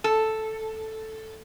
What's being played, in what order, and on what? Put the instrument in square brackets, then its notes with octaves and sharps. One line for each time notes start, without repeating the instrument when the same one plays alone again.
[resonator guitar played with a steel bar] A4